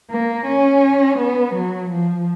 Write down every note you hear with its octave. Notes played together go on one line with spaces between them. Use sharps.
A#3
C#4
B3
F#3
F3